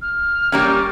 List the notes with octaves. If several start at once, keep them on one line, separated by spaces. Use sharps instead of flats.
F6
G3 A#3 C#4